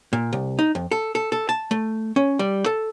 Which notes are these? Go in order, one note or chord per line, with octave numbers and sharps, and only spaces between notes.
A#2
C2
D#4
F2
A4
A4
A4
A5
A3
C#4
G3
A4